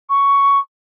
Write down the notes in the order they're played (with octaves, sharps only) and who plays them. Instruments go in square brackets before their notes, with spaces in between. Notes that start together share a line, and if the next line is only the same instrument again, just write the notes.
[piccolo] C#6